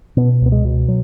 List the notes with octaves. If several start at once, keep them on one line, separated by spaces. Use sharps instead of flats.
B2 B3
C#2 B3
G#3
B2
F#3